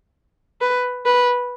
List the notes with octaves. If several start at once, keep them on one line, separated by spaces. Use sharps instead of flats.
B4
B4